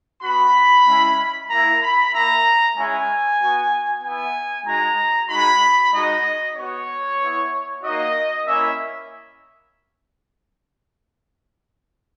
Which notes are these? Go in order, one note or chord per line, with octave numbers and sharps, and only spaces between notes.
B3 F#4 B5
G#3 C#4 E4
A#3 E4 A#5
B5
A#3 E4 A#5
G#3 C#4 E4 G#5
B3 F#4
B3 E4 G#5
G#3 D#4 F#4 A#5
G#3 D#4 F#4 B5
G#3 D#4 F#4 D#5
B3 F#4 C#5
B3 E4
A#3 D#4 F#4 D#5
A#3 C#4 E4 E5